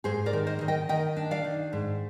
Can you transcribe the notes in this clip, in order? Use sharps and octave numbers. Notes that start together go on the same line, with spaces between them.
G#2 G#4 C5
A#4 D5
D#3
C5 D#5
D#3
D#5 G5
D#3 D#5 G5
D4
D5 F5
D#3
G#2